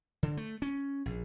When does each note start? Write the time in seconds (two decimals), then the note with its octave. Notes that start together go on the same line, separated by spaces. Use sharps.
0.23 D3
0.37 A3
0.62 C#4
1.06 A#1